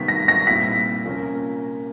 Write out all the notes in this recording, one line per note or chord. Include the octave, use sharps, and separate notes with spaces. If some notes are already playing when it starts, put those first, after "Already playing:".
Already playing: C3 D#3 G3 B3 B6
A#6
A#6
A#2 G3 C4 E4 B6
C3 F3 A#3 C#4